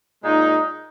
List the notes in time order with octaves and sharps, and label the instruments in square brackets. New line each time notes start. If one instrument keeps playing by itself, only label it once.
[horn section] A#2 G#3 D#4